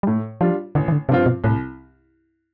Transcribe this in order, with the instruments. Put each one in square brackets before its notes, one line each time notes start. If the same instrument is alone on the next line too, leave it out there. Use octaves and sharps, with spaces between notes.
[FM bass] G3
[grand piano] A2 [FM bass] A3
[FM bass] F3 [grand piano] G3 D4 F4
[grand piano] A1 [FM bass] D3
[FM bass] E3
D3
[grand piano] G2 F3 C4 F4 [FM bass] C3
[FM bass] B2
[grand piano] C2 [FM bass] A2